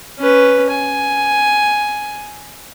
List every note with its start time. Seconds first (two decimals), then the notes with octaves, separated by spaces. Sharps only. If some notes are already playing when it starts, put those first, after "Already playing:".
0.19 C#4 B4
0.70 G#5